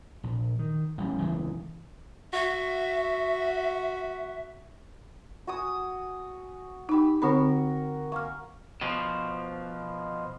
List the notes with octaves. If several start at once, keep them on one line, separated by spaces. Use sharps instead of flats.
A#1
D#3
A1 G3 C#4
E1 C#2 C#3 E3
F#4 E5
F#4 G#5 D#6
D#4 G4 B5 E6
D3 C4 F#4 A#4 B5
A#3 G#5 C#6 F6
B2 F3